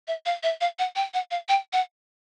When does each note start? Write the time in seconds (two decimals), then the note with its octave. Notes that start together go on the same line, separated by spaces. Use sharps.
0.08 E5
0.26 F5
0.43 E5
0.61 F5
0.79 F#5
0.96 G5
1.14 F#5
1.31 F5
1.49 G5
1.73 F#5